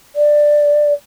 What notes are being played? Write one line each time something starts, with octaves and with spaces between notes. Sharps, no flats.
D5